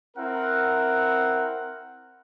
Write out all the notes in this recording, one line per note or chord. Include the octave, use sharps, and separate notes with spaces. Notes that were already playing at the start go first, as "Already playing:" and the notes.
C4 E4 A#4 F#5